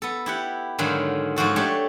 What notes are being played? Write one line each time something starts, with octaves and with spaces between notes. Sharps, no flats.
B3 A4
E4 G4 F#5
G#2 D3 D#3 F#3 F4
G#2 F3 F#4 A4
A3 D4 G4 C#5 A5